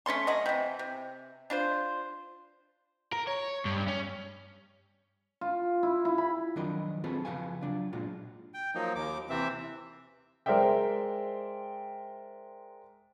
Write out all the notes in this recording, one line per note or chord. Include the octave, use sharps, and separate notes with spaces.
A3 C#4 A4 C6
F#3 D#5
C3 E3
C3
D4 F4 C5
A#4
C#5
G2
C#4
F4
E4
E4
B5
D#3 F3 F#3 D4 A#4 D#5
C4 F4 F#4 G#4 A4 B4
C#3 F3 F#4 B4 F5 G#5
F#3 D4 F4
A#2 G#3 D4 F4 F#4
G5
F3 F#3 A#3 D#4
D#2 D6
C3 E3 C4 E5
G#3 A#4 C5 D5 E5 G5